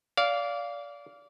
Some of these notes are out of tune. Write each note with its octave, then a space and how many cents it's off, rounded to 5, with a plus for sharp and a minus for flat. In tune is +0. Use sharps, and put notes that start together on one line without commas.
D5 -25 F5 +0